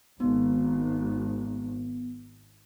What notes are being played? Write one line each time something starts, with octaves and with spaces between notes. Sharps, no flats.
G#1 B3